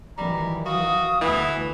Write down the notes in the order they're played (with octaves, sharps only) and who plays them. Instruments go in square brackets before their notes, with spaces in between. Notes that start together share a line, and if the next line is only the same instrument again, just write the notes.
[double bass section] D#3 E3 F#3 [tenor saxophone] G3 [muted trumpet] A#5
[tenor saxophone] F#4 [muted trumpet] F5 [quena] D#6
[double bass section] D2 A3 [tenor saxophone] E3 [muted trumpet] B3